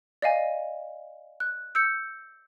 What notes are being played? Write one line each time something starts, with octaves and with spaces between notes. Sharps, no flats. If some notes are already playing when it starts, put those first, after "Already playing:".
D5 D#5 F5 G#5
F#6
E6 G6 C#7